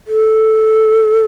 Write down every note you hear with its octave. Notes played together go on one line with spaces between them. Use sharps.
A4